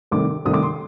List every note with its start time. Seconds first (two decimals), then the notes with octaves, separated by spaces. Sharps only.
0.11 C2 C3 D#3 A3 D6
0.45 C2 C3 D#3 A3 D#6
0.53 D6
0.63 C6